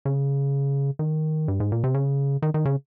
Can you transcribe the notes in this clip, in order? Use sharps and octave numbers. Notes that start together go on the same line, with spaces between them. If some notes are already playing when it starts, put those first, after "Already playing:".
C#3
D#3
G2
G#2
A#2
C3
C#3
D#3
D#3
C#3